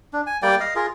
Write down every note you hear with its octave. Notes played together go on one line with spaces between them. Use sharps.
D4
G#5
G3 A#3 D5 G5
D#5 F5
F4 G#4 A#4